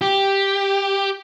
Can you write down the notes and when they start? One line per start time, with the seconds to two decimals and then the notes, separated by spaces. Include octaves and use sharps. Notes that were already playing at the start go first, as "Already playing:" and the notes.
0.01 G4